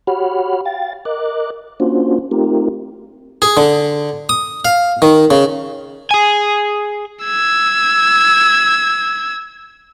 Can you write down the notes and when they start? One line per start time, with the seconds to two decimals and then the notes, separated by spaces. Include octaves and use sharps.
0.07 F#4 G4 C#5 F#5 B5 F6
0.65 F5 G5 A6
1.05 A#4 D#5 D6 F#6
1.80 A#3 C#4 D4 F4 F#4 C5
2.31 A3 C4 D#4 F4 G4 A#4
3.42 G#4
3.57 D3
4.29 D#6
4.65 F5
5.02 D#3
5.31 C#3
6.11 G#4 G#5
7.25 E6 G#6